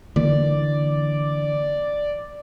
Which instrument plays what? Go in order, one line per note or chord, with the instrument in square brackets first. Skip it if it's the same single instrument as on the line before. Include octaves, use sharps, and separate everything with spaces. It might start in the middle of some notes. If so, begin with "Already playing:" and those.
[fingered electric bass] D3 E3 A#3 [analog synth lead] D5